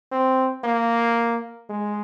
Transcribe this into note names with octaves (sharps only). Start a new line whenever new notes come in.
C4
A#3
G#3